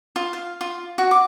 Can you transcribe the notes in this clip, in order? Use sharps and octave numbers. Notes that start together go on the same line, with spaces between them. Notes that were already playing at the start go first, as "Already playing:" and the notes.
F4
F5
F4
F#4
D6